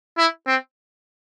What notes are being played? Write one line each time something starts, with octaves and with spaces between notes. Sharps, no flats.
E4
C4